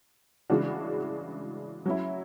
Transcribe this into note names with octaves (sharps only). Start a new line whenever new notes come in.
C#3 E3 G#3 D4 F#4
F#3 C#4 E4